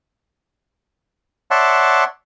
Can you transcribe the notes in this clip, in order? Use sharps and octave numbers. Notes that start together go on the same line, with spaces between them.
C#5 D5 E5 F#5 A5 C6